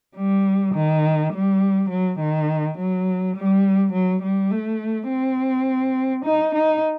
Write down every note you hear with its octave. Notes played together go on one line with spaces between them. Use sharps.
G3
D#3
G3
F#3
D#3
F#3
G3
F#3
G3
A3
C4
D#4
D#4